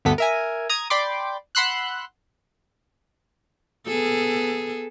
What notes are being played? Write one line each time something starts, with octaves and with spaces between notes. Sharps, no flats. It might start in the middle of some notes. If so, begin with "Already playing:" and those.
D2 G2 B3 A4 B6
A#4 E5 G#5
A#5 D#6 G#6
D5 G5 B5 C6 D6
F#5 B5 C6 E6 F#6
B3 G#4 A4